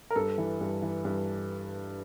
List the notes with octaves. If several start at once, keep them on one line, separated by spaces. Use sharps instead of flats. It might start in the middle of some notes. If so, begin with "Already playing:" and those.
A#4
G2 A4
E3
G2
E3
G2